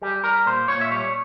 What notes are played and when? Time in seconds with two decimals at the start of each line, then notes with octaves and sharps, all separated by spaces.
0.02 G3 G4
0.24 G3 A#4
0.46 A#2 C5
0.68 A#2 C#5
0.81 E5
0.91 G3 C#5